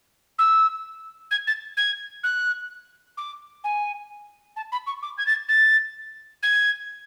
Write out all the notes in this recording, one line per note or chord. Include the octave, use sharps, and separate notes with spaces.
E6
G#6
A6
G#6
F#6
D6
G#5
A5
B5
C#6
D6
G#6
A6
A6
G#6